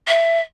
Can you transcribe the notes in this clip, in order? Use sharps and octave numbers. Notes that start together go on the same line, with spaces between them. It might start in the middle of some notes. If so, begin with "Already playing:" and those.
E5